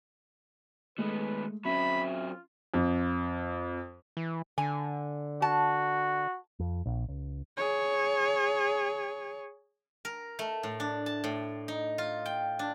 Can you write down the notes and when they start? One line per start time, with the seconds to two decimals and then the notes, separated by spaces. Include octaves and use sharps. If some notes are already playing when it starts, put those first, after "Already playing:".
0.98 D#3 G#3 A3 B3 B4
1.65 F#3 C4 C#4 E5 B5
2.12 F4
2.74 F2
4.17 E3
4.58 D3 G#5
5.42 F#4 A5
6.60 F2
6.86 A#1
7.08 C#2
7.57 G#4 C#5
10.05 A#4
10.39 A3
10.63 A2
10.80 D4
11.06 A5
11.24 A2
11.68 D#4
11.98 F4
12.26 G5
12.59 D4